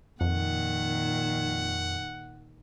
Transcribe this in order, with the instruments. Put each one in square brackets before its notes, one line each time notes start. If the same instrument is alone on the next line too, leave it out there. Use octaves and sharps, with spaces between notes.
[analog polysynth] F2 [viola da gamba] A#2 D#3 [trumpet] F#5